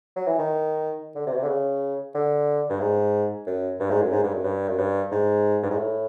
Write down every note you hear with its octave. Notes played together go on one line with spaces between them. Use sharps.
F#3
E3
D#3
D3
C3
B2
C3
D3
C#3
D3
G2
G#2
F#2
G2
G#2
F#2
G#2
G2
F#2
G2
F#2
G2
G#2
G2
G#2
A2